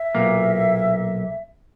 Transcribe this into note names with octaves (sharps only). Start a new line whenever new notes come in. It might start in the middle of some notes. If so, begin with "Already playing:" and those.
Already playing: E5
B1 A#2 A#3